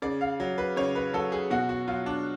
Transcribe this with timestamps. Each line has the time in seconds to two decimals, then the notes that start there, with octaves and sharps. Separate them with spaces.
0.02 C#3 D5
0.21 F5
0.40 F#3
0.58 B4
0.76 C#3 C#5
0.95 B4
1.13 F#3 A4
1.32 G#4
1.50 B2 F#4
1.69 F#4
1.88 F#3 F4
2.06 D4